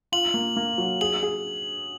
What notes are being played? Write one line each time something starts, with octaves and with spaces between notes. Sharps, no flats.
F4 F#7
A#3
A#3
F#3
G#4 F#7
G#4